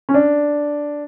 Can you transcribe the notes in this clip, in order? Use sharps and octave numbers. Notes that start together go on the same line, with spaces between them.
C#4
D4